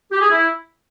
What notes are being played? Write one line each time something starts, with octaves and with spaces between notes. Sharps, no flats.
G4
G#4
E4